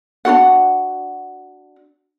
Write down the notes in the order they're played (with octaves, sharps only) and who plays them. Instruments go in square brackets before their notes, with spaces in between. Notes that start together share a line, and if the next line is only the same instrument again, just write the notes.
[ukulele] D4 F4 F#4 F#5